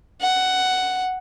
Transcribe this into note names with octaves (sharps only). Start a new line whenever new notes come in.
F#5